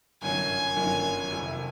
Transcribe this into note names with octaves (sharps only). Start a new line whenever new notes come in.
G1 F#2 D#3 F#3 G#5
G1 F#2 D#3 F#3
F2 C3 D#3